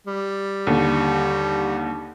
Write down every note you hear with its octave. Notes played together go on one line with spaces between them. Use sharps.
G3
D#2 D3